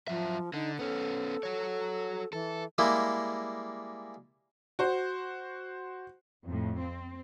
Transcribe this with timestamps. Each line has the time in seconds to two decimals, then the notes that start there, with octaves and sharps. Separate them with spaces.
0.08 F3 F#3 E5
0.54 D3 D#4
0.79 B3 C#4 A4
1.43 F#4 C#5
2.33 E3 A4
2.78 G3 G#3 A#3 E4
4.79 F#4 C5
6.46 F2 A2
6.81 C4